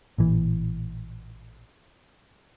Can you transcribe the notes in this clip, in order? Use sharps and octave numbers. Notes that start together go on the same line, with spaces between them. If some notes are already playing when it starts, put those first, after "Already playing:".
A1 A#2 E3